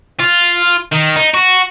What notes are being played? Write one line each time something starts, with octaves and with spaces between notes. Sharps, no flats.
F4
D#3
D#4
F#4